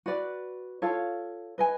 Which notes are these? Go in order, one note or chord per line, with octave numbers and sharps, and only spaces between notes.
F#4 B4 D5
F4 A4 C#5 F5
B4 D#5 G#5